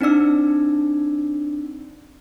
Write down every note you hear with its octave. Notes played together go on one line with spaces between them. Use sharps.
C4 D4 D#4 D5 E6